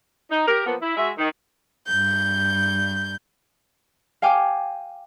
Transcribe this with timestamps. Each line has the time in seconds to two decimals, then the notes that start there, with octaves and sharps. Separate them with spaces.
0.31 D#4
0.47 G4 A#4
0.65 F3 A#3 B3
0.82 E4
0.97 G#3 F#4 E5
1.19 D#3
1.88 G2 G6
4.22 F5 G5 G#5 D6 F6